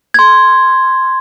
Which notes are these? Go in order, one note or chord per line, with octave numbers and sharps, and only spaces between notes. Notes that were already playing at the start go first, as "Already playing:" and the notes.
C6 G#6